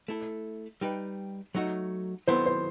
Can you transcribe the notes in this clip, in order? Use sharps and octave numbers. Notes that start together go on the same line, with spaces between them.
A3 E4 A4
G3 D#4 G4 B4
F#3 A3 D#4 F#4
D#3 F#3 B3 E4 A4 C5
C5